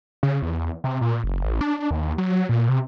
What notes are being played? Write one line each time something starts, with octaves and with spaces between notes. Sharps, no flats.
C#3
E2
C3
A#2
F#1
A1
D4
D#2
F#3
A#2
C3